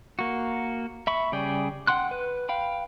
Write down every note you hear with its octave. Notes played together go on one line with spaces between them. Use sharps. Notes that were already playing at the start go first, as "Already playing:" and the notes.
A#3 F#4
E5 B5 C#6
C#3 G3 G#4 D5 G5
F#5 G5 C6 F#6
B4
F5 G5 B5